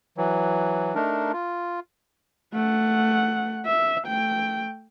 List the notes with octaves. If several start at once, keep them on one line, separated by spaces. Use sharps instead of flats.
E3 F#3
A3 D4 D#4 A#4
F4
A3 F#5
E5
A3 G5